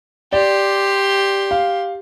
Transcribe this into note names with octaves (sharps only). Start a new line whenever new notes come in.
G4 D5 C6
F5